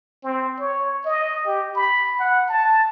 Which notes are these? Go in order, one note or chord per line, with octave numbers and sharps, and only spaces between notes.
C4
C#5
D#5
G4
B5
F#5
A5